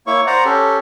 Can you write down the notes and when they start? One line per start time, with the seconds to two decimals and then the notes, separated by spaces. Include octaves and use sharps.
0.07 A#3 E4 C#5 C#6
0.27 C5 D5 F#5 A#5
0.45 C#4 G4 A4